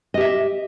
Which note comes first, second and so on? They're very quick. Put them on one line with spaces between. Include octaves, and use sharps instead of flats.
D#5 G4 E5